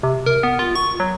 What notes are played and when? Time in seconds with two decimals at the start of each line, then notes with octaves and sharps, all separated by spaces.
0.03 C3
0.26 A#4
0.43 B3
0.59 F4
0.75 C#6
1.00 F#3